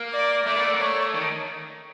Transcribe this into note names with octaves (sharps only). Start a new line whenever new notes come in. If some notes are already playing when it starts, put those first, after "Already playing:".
Already playing: A#3
D5
A3 D5
A#3
A3
A#3
A3 C#5
D#3